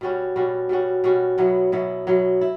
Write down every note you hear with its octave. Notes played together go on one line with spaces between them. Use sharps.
B2 G3 C#4 F#4
B2 G3 C#4 F#4
B2 G3 C#4 F#4
B2 G3 C#4 F#4
B2 F#3 B3 E4
B2 F#3 B3 E4
B2 F#3 B3 E4
E4